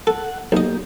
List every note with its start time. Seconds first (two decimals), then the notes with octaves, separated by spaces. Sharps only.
0.07 A4 F#5
0.52 B1 A#3 G4 D#5